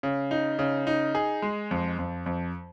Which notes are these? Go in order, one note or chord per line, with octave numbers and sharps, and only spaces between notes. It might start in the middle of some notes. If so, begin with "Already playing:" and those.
C#3
D#4
C#3
D#4
G#4
G#3
F2
F2
F2